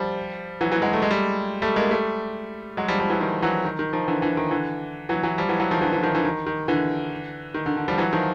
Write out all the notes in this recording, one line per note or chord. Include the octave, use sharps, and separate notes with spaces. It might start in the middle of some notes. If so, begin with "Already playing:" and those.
Already playing: F3 G3
E3 F#3
E3 F#3
F#3 G#3
A3
G#3
G3 A3
G3 A3
G#3 A#3
G3 A3
F#3 G#3
F3 G3
F3 G3
E3 F#3
D#3 F3
E3 F#3
D#3
D#3
D#3 F3
D3 E3
D3 E3
D#3
D3 E3
E3 F#3
E3 F#3
F3 G3
E3 F#3
E3 F#3
D#3 F3
D3 E3
D3 E3
D#3 F3
D3 E3
D#3
D#3
D3 E3
D#3
D3
D3
F3 G3
E3 F#3
D#3 F3